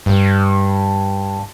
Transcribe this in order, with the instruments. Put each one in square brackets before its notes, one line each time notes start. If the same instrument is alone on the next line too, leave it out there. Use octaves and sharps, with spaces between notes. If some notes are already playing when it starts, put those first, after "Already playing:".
[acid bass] G2